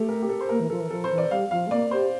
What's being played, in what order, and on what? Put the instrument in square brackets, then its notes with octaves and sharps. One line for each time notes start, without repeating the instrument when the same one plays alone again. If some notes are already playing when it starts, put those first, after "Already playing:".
Already playing: [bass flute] A3 [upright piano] G4 A4
[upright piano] A#4
G4
A4
C5
[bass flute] A#3 [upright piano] A#4
[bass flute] E3
[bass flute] F3 [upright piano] A4
[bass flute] E3
[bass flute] F3 [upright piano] A4
[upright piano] C5
[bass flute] E3
[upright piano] D5
[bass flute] G3 [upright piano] F5
[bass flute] F3 [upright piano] F5
[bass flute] A3
[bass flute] A#3 [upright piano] D5
[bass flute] G4 [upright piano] C5